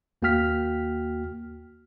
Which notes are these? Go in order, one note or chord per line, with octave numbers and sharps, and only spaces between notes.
D#2 A#3 F#4 G5 F6 B6